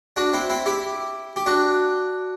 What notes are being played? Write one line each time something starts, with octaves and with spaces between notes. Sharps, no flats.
D4 F#4
C4 E4
C4 E4
E4 G4
G4
D4 F#4